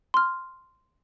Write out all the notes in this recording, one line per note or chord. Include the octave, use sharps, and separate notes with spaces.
C6 F6